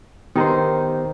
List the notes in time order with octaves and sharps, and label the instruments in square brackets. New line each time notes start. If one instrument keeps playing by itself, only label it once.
[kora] D#3 C5 [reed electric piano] B3 G4 A#5